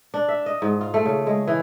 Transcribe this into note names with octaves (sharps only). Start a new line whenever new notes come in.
D4
E5
D#5
G#2
F4
A3
C#3
G#3
E3